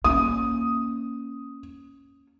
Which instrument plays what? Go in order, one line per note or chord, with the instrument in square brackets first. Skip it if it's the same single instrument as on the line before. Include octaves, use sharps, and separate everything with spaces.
[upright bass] A#3 C#4 [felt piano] D#6